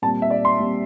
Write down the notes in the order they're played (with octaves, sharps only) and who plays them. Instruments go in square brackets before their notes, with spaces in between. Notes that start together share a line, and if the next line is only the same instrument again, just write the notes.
[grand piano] A#2 G3 C4 A5
E5
D5
C6
A#2 G3 C4